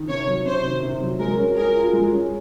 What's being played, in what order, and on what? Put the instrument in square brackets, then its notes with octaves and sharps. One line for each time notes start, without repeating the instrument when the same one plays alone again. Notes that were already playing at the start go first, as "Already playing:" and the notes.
Already playing: [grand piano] D#3
[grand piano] C3 [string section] C#5
[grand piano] F#3
[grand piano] C3 [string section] C5
[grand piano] D#3
C3
F#3
[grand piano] G#3 [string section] A#4
[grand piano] C#4
[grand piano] G#4 [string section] A#4
[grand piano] F4
G#3
C#4